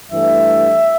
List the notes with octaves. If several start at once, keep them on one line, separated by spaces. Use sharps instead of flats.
G2 E3 A3 E5